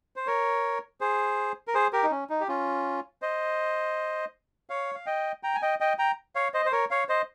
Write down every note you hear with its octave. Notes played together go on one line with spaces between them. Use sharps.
C5
A#4 C#5
G#4 C5
A#4
G#4 C5
G4 A#4
D#4
C#4
D#4
G4
C#4 F4
C5 D#5
C#5 F5
F5
D#5 G5
G5 A#5
G#5
D#5 G5
D#5 G5
G5 A#5
C#5 F5
C5 D#5
C5
A#4 C#5
C#5 F5
C5 D#5